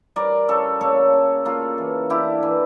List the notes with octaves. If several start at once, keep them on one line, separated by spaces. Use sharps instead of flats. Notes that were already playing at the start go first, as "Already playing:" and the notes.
G3 A#4 D5
C#3 A4 C#5
A#3 A4 C#5
C#4
A#3 F4 A4
E3
D4 E4 G4
E3